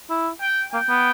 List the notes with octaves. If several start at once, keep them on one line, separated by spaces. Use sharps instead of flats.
E4
G5
A#3 G5
B3